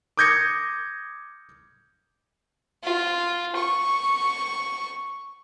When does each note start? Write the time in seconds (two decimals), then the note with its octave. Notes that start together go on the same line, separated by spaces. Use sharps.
0.17 D6 D#6 G6 G#6 A#6 C#7
2.83 F4
3.56 C#6